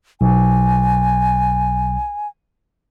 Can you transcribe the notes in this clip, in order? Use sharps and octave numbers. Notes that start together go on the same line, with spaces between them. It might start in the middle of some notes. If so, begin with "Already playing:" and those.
B1 G#5